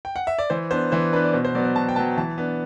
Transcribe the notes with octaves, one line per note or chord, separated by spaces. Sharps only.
G5
F#5
E5
D5
E3 C5
B3 D4 C5
E3 C5
B3 D4 B4
D5
B2 C5
C5
F#3 B3 D5
D5
B2 A5
G5
F#3 B3 A5
E3 A5
B3 D4